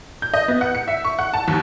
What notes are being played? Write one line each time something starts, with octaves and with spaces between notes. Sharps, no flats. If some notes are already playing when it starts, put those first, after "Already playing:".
G6
D#5
B3
F#5
C#7
E5
C#6
F#5
A5
D#2